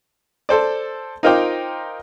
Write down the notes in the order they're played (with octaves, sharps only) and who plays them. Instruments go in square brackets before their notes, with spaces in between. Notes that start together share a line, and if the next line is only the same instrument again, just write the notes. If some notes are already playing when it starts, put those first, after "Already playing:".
[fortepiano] A4 C5 D5
D#4 F4 A#4 C5 G5 D6